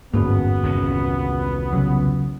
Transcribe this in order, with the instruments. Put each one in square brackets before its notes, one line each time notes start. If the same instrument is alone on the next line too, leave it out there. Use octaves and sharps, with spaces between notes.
[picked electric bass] G1 A#3 [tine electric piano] E2 F#4 G#4 [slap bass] G#2 C#4 [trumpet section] B3
[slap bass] C2 D#3 C#4
[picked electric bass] C#3 F#3